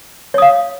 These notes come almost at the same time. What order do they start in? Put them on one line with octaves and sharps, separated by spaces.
C#5 D#6 F5